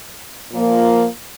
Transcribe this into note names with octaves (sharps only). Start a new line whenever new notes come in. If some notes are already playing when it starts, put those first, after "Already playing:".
A#2 F3 A#3